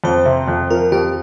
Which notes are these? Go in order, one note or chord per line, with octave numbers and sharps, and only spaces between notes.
F2 C5
C3
F2
F3 A#4
F2 G4